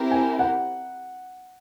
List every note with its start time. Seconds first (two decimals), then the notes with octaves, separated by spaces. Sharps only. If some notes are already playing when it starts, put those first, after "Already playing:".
Already playing: C4 E4 G4 A#4
0.11 G#5
0.39 F#5